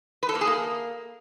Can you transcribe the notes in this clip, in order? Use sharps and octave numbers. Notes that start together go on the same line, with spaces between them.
B4
A4
A#3
G#4
A#3